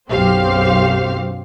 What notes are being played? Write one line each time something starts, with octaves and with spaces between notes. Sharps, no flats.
B1 F#2 C4 G4 C5 F5